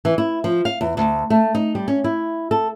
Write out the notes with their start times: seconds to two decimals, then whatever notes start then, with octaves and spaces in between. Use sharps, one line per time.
0.05 E3
0.18 E4
0.44 F3
0.65 F5
0.81 E2
0.97 D2
1.30 A3
1.55 D#4
1.75 G3
1.88 C#4
2.04 E4
2.51 A4